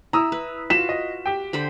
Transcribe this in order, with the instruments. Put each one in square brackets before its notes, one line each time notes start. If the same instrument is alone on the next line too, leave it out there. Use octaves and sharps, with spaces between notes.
[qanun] E4 [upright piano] A#5 D#6 E6
[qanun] B4
[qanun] F4 F#4 [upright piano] B6 [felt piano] E7
[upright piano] D#5
G4 G5
[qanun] D3 C5 B5